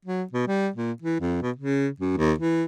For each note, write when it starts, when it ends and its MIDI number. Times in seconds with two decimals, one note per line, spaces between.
0.05 0.23 54
0.32 0.46 47
0.47 0.69 55
0.76 0.92 46
1.02 1.20 52
1.20 1.39 41
1.42 1.51 47
1.56 1.88 49
2.00 2.12 42
2.17 2.32 39
2.38 2.64 52